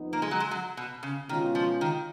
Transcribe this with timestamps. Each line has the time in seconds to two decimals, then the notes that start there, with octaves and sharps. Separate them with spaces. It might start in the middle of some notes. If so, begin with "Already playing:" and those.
Already playing: F2 F3 B3 D#4
0.13 A#3
0.22 G#3
0.31 F#3
0.40 G#3
0.51 F#3
0.77 B2
1.03 C#3
1.29 B2 D#3 G#3 C#4 F4
1.55 F3
1.81 D#3